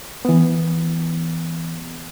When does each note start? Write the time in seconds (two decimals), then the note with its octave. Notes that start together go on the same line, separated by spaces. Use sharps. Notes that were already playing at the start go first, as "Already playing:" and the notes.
0.25 E3 B3